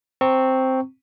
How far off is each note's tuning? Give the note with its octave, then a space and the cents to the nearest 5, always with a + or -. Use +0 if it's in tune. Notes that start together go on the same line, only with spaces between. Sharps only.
C4 +0 A#5 -35 C#6 +0